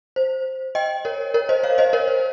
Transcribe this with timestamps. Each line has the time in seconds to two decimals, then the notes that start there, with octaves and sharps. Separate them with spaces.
0.16 C5
0.75 D#5 G5
1.05 A#4 C#5
1.34 A#4 C#5
1.49 C5 D#5
1.63 C#5 F5
1.78 C5 D#5
1.93 A#4 C#5
2.08 C5